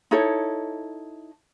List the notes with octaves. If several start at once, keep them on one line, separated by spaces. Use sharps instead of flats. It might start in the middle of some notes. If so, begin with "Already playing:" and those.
D#4 E4 A4 C#5